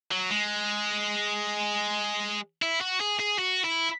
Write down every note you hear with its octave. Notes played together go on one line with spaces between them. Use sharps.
F#3
G#3
E4
F#4
G#4
G#4
F#4
E4